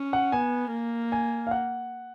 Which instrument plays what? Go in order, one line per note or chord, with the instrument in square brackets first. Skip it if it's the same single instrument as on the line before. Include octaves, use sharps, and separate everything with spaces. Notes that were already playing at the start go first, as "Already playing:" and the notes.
Already playing: [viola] C#4
[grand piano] F#5
[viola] B3 [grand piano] G#5
[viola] A#3
[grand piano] G#5
F5
F#5